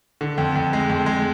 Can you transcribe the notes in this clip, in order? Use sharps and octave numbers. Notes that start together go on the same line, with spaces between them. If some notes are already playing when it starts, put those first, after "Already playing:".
D3
F2
F2
G#3
F2
G#3